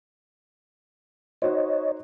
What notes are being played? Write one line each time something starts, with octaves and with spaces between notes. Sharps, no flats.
D#4 F#4 C5 C#5 D#5